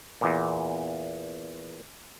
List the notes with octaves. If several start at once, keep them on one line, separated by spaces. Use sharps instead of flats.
E2 A#2